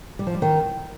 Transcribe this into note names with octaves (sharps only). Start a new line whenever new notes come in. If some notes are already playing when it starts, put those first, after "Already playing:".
G3
F3
G3
D#3